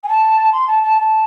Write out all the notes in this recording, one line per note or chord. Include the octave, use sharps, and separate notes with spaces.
G#5
A5
C6
A5
A5
A5